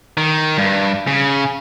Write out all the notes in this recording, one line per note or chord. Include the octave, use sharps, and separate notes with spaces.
D#3
G2
C#3